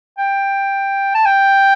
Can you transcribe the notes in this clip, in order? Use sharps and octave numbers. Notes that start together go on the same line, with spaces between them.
G5
A5
G5